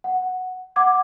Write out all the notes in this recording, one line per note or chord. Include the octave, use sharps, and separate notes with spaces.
F#5
F#5 D6 G#6